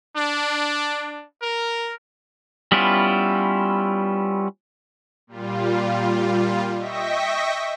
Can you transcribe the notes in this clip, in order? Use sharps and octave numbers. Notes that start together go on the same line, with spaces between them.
D4
A#4
G3 B3 C#4 E4 F4
A#2 G3 F4
D#5 E5 G5 C#6 A#6 B6